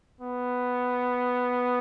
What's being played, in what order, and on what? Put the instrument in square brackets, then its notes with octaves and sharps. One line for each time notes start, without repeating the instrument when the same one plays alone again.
[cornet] B3